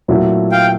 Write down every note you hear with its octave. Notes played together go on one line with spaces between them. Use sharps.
A#2 F#3 A3 C4 E4
F5 G5